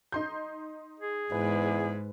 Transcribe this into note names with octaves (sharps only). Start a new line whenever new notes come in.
D#4 C6 G6
G#4
E2 G#2 B4